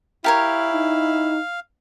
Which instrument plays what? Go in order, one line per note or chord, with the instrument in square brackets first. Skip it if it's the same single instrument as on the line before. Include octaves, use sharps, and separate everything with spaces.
[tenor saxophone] E4 [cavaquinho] G4 A#4 C#5 [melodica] F5
[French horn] D#4